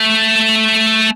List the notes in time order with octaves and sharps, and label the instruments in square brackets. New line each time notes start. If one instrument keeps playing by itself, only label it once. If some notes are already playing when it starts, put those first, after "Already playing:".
Already playing: [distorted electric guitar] A3